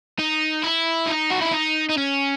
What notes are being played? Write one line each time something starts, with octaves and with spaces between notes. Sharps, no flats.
D#4
E4
D#4
F#4
E4
D#4
D#4
C#4